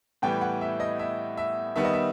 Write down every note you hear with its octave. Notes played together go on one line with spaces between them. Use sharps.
A2 E3 G3 B3 G5
F#5
E5
D#5
E5
E5
D#3 G3 B3 E5
D#5
E5